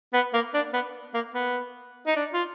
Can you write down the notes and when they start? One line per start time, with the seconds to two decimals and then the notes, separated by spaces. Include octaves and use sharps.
0.14 B3
0.33 A#3
0.54 D4
0.73 B3
1.14 A#3
1.34 B3
2.07 D#4
2.16 D4
2.33 F4